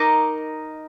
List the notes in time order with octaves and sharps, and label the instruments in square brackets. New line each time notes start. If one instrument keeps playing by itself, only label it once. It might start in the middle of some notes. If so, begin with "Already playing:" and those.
Already playing: [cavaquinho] D#4 A#4 D#5 D6